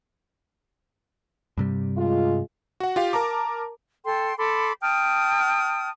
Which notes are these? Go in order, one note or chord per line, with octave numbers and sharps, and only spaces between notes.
G2 C3 G3
G#3 F4
F#4 F#5
F4 G4 F5
A#4 A5 A#5 D6
A4 G5 C6
A4 B5 C6 D6
G5 A5 D#6 F6